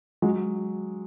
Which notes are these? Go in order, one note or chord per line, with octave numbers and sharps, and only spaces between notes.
F#3 G#3